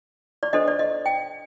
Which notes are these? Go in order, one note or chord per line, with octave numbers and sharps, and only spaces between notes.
D5
D4 A4 C5 D#5
D5
D#5
G5